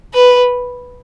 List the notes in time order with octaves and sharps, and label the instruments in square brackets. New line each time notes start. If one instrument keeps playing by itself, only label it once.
[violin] B4